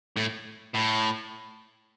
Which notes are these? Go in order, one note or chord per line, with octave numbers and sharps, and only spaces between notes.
A2
A2